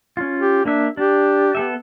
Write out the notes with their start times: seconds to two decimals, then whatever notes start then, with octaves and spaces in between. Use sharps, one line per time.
0.17 C#4 F4
0.39 G4
0.65 A#3 D4 E5
0.97 D4 G4
1.55 B3 A4 E5